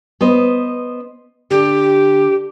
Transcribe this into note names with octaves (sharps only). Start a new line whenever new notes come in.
B3 C5 D#5
D3 G4